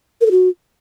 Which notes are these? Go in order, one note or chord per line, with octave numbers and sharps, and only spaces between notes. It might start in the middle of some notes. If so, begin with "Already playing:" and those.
A#4
A4
F#4